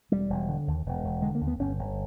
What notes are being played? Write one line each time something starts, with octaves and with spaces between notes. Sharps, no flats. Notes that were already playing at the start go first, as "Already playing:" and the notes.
E1 G3
E1
D3
D#2
E1
E1
D3 G#3
A#3
D#2
B3
G1 C#4
G1